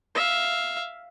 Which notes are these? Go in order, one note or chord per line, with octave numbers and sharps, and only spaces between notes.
E5 F5